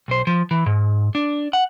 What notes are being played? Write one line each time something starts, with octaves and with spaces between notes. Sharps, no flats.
B1 C5
F3
E3
G#2
D4
F#5